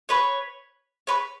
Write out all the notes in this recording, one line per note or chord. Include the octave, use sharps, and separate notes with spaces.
B4 C#5
B4 C#5